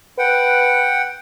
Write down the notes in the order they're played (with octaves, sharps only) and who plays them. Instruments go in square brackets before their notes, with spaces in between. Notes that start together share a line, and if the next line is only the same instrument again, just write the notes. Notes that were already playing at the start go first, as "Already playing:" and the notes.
[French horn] B4 [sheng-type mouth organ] F#5 G5